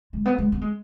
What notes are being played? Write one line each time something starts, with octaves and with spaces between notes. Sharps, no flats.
G#3
B3
G#3
B3
G#3